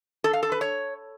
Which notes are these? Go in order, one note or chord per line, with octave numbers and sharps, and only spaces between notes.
A4
F5
A4
B4
C#5